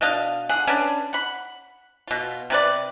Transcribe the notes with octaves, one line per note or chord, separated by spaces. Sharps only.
B2 D4 D#5 F5
D3 G#4 F#5
C#4 D4 B4
F#5 B5
B2 F4
C3 B4 D5